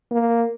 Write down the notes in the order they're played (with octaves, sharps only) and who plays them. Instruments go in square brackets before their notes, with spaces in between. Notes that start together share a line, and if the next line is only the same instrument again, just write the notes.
[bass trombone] A#3